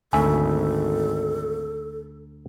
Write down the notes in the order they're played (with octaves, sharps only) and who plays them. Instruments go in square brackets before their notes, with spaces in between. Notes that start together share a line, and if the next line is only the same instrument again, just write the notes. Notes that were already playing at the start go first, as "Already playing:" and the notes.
[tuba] G#1 [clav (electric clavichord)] D2 E5 [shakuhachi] A4 [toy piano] G#5